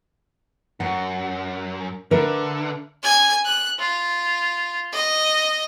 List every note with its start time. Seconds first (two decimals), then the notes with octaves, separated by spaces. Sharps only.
0.80 F#2 F#5
2.11 D3 A#4 B4 E5
3.03 G#5 G#6
3.45 F#6
3.79 F4
4.93 D#5